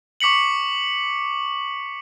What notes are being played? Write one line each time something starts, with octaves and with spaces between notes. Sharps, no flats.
C#6 D6 B6 C#7 F#7